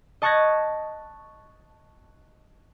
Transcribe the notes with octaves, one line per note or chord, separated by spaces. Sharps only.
D#5 A5 C#6 F#6 G#6 A#6